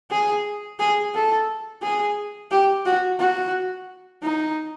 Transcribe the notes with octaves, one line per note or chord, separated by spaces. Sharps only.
G#4
G#4
A4
G#4
G4
F#4
F#4
D#4